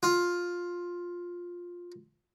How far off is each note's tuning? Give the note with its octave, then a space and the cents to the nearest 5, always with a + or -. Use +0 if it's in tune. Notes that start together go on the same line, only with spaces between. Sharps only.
F4 +10